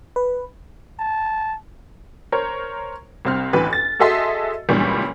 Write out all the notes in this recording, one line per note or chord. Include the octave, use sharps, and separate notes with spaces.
B4
A5
A#4 C5 C#5
C2 C4 F6
A1 D2 E3 B4
A6
F#4 G#4 A4 D#5 E5 C6
C#2 F#2 A#2 E3 G3 C#6